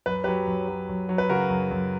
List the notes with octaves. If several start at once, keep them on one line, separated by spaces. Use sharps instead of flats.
F#2 B4
F#3 G4 B4
F#2
F#3
F#2
F#3
B4
C#3 F#4 A#4
F#2
F#2